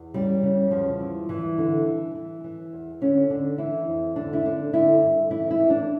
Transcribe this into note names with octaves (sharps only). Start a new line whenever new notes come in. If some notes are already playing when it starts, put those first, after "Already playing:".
Already playing: E2
C#3 G3
C#3
E2 F3
E3
G2 E3
D3
E3
E3
E3
E2
D3 C#4
D3 D4
E3 E4
F2
D3 D4
E4
D3 D4
D3 E4
G2
E3 E4
E4
E3
D4